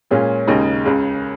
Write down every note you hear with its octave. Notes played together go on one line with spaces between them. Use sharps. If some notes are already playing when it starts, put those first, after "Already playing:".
A#2 G#3 C#4 F4
D#2 C#3 G#3 D#4
C#2 C#3 G#3